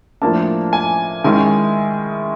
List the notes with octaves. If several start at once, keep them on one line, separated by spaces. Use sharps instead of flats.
A2 F3 A#3 D4 A5
G#5
D#3 G#3 C#4 E4 G#5